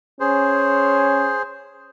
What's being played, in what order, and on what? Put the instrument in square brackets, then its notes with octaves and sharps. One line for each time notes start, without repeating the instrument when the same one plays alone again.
[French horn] C#4 [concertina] G#4 C5